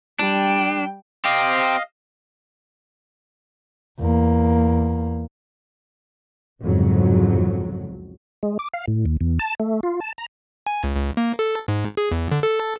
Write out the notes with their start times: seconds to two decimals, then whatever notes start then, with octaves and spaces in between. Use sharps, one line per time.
0.19 G3 D4 G5
1.25 C4 G4 D#5 F5
4.00 E2 A#3
6.61 C2 F2 G#2 C#3 F#3
8.43 G#3
8.59 D6
8.73 F5
8.88 A2
9.06 D#2
9.21 E2
9.39 A5
9.60 A3
9.83 F4
10.00 A5
10.18 A#5
10.67 G#5
10.84 C#2
10.96 C#2
11.17 A#3
11.39 A4
11.68 G#2
11.97 G#4
12.12 E2
12.32 D3
12.43 A4